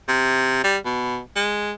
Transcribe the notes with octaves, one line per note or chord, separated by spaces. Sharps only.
C3
G3
B2
G#3